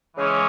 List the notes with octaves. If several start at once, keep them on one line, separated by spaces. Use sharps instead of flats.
C#3 E3 G#3 C#4